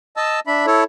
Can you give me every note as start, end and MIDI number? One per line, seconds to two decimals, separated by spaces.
0.17 0.40 75
0.17 0.40 81
0.17 0.40 88
0.47 0.66 62
0.47 0.66 76
0.47 0.66 83
0.66 0.84 64
0.66 0.84 69
0.66 0.84 73